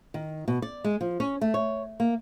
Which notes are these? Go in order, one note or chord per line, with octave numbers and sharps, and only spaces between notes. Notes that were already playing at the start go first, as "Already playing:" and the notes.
D#3
B2
D5
G#3
F3
C#4
A3
C#5
A#3